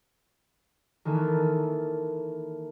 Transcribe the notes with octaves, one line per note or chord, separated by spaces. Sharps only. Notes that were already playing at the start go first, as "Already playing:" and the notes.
D#3 E3 A#3 A4